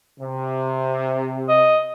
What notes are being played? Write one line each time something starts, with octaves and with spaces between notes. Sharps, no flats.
C3
D#5